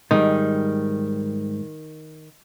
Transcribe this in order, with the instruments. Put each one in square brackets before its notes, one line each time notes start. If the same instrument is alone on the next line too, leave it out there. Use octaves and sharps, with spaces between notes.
[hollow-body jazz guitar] G#2 G3 [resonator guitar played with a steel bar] D#3